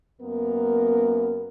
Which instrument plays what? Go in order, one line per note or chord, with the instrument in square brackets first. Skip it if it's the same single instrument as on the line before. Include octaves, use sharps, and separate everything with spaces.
[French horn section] F#2 A#3 B3 A#4